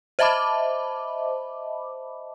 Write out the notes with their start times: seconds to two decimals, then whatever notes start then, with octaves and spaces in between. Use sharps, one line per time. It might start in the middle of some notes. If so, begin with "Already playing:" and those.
0.19 C5 D#5 E5 A5 B5 D6